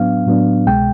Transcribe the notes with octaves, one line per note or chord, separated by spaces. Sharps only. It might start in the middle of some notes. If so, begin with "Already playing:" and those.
Already playing: A2 F#3 B3 D4 F5
A2 F#3 B3 D4
C2 B2 G#3 G5